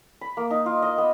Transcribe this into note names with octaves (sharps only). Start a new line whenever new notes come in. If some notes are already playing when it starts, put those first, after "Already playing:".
B5
A#3
D#4
F4
D#5
B3